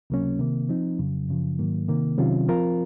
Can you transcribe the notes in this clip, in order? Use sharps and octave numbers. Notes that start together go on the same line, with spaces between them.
C#2 C3 F#3 A#3 C#4
C3 D#3 A#3
F3 C4 D#4
F2 C#3 F#3
F#2 C#3 F3
G#2 D#3 F#3 A#3
C3 D#3 A#3
C3 D#3 F#3 C#4 F4
F3 C4 F4 A#4